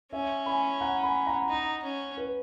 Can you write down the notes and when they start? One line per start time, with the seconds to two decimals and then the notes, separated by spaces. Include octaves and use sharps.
0.12 C#4 E5 G#5
0.46 G#5 B5
0.81 F#5 A#5
1.03 G#5 B5
1.27 F#5 A#5
1.49 D#4
1.84 C#4
2.17 B4